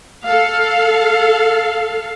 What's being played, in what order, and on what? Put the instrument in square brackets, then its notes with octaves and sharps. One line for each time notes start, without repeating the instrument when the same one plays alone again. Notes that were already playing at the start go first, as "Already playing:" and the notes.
[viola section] A4 F5